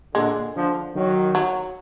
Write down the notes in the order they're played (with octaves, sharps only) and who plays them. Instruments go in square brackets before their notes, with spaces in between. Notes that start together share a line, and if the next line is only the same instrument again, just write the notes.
[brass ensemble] A#2 D3 [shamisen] G#3
[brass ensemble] D3 F3
D#3 F#3
[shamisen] F#3